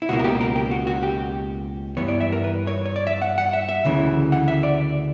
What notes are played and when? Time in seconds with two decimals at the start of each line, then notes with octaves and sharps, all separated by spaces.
0.02 E4
0.09 C#2 B2 A#3 F#4
0.19 A#4
0.24 G4
0.41 A#4
0.56 G4
0.71 F#4
0.87 F#4
1.03 G4
1.97 G2 E3 B3 C#5
2.08 D5
2.20 E5
2.32 A#4
2.44 B4
2.67 C#5
2.86 C#5
2.96 D5
3.07 E5
3.22 F#5
3.38 F#5
3.53 E5
3.69 E5
3.85 D2 C#3 E3
4.32 F#5
4.48 E5
4.63 D5